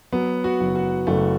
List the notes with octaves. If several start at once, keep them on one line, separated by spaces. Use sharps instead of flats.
F#3 B3
F#4
F#1
F#4
F#1 A3